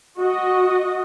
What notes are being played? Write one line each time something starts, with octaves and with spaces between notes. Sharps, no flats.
F#4 D#5